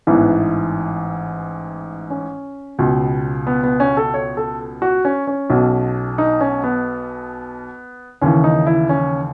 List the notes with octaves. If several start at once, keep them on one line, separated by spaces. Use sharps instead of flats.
A1 G#2 E3 B3
C#4
C#2 B2
B3
B3
C#4
A4
C#5
A4
F#4
C#4
C#4
B1 B2
D#4
C#4
B3
D#2 C#3 E3 C#4
D#4
E4
C#4